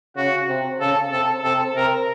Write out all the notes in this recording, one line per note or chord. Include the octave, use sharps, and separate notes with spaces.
C#3 F#4
C3
C#3 A4
C3 A4
C3 A4
C3 A#4